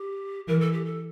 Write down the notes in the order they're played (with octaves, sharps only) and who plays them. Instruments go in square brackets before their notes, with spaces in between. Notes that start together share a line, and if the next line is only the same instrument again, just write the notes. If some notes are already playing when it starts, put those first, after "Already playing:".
Already playing: [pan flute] G4
[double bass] E3 [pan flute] A#4
[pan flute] A4
G4
A4